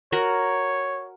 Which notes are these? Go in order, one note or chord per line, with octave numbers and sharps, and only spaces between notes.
F#4 A#4 C#5